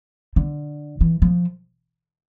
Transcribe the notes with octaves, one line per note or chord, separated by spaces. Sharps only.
D3
E3
F3